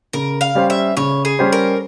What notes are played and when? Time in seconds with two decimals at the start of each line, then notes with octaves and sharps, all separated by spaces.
0.13 C#3 A#4
0.41 F5
0.55 G3 C#4 G4 C5
0.70 E5
0.97 C#3 C#5
1.25 G#4
1.39 G3 C#4 G4 C5
1.53 A#4